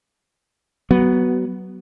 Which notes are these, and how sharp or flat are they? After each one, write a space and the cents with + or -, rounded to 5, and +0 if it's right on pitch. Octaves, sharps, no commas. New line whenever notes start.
F#3 +25 B3 +0